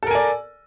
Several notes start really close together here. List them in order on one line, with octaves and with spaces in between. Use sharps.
A4 A#4 G#5 D5